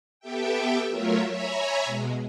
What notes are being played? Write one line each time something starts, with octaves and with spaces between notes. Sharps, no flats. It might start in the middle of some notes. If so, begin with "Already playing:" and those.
B3 G4 A4 E5 G5
F#3 A3 F4 A#4 C#5 E5
C#5 E5 G#5 A#5 B5
B2 G#3